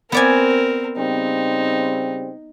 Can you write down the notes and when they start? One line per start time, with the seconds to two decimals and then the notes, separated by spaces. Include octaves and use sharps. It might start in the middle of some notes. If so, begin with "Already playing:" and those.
0.12 B3 C4 A#4 D5 G#5
0.97 C#3 G3 C4 D#4